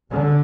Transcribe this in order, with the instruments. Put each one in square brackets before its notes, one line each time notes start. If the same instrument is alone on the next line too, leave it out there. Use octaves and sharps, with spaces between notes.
[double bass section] B1 D3